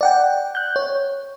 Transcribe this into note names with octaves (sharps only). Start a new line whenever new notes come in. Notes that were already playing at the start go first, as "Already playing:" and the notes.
D5 F#5 G5
F#6 G6
C#5